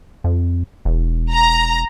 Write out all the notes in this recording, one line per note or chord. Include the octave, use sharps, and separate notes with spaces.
F2
E1
A#5